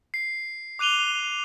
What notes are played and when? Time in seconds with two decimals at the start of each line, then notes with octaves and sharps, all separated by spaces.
0.14 C7
0.79 D6 F#6 D#7 F7 G7